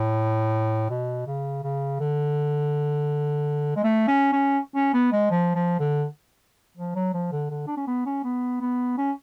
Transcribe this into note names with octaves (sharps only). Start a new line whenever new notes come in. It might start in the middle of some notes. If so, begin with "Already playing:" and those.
Already playing: A2
B2
C#3
C#3
D3
G#3
A3
C#4
C#4
C#4
B3
G#3
F3
F3
D3
F3
F#3
F3
D3
D3
D4
C#4
B3
C#4
B3
B3
C#4